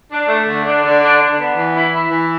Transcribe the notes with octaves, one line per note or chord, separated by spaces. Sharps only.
D4
A3
D3
D4
D3
D4
D4
B3
E3
E4
E4
E3